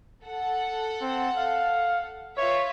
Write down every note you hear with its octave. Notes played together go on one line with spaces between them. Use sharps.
A4 F#5
C4
F5
F4 B4 C#5 E5